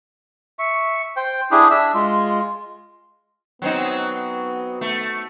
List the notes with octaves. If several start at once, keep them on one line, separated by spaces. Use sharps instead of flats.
E5 C#6
C5 G5
D4 E4 G4 G#4
D4 E5 E6
G#3 F4
F#3 B3 C4 D#4
A3